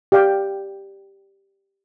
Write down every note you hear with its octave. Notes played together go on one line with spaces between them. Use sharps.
G4 D5 F5 G5